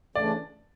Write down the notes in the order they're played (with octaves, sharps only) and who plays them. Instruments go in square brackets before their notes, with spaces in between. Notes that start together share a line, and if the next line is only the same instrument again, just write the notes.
[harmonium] C#3 E3 A3 D4 [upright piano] D5